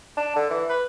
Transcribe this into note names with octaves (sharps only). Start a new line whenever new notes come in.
D4
D3
E3
B4